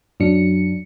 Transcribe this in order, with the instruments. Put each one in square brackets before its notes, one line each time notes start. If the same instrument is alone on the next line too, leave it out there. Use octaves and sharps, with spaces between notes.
[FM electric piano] F#2 F#3 D4 C#7